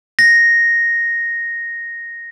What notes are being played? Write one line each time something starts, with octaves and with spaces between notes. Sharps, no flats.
A#6